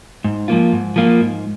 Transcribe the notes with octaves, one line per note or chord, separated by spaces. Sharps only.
G#2
F3 A#3 F4
G#2
F3 A#3 F4
G#2